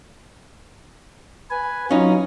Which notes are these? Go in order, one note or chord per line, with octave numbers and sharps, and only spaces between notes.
B4 G#5
F#3 C#4 D#4 F4